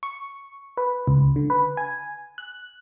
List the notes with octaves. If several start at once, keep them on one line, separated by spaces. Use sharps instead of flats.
C#6
B4
C#2
D3
B4
G#5
F#6